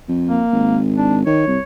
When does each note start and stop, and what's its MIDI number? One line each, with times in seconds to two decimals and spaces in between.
0.09 0.40 41
0.29 0.78 58
0.52 1.24 32
0.98 1.17 62
1.26 1.42 51
1.26 1.62 73
1.47 1.58 36